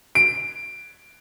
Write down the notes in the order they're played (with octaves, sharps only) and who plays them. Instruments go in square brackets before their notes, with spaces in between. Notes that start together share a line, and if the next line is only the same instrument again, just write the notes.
[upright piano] D7